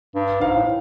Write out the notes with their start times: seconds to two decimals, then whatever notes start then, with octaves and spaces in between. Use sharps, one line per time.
0.15 G2
0.41 G#2 F5
0.56 A2